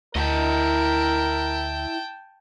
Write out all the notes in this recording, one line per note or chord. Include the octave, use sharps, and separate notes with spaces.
D2 E4 A#4 D#5 G5 A5